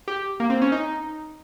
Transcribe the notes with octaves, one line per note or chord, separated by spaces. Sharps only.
G4
A#3
C4
C#4
D#4